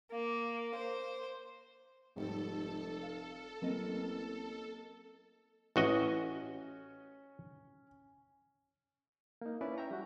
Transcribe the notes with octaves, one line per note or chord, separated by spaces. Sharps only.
A#3
C5
F1 G#2 G3 A4
F5
A1 F#3 A#3 C4 D#5
A1 C#4 F#4 D#5
A#3 D#4
C#4 E4 B4 D5
E5 G5 A#5 C#6
G3 F#4